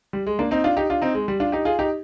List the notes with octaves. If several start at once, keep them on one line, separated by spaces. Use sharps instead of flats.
G3
G#3
A#3 D4
C4 D#4
D4 F4
D#4 G4
D4 F4
C4 D#4
G#3
G3
D4 F4
D#4 G4
F4 G#4
D#4 G4